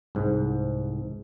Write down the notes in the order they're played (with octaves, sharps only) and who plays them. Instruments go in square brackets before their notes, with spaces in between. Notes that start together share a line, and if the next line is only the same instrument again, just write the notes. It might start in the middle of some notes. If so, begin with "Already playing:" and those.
[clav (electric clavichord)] C2 G#2